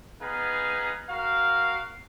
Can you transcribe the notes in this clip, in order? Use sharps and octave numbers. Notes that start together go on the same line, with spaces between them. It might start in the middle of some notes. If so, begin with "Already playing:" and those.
B3 D#4 G#4 B4 F5
F#4 A#4 F5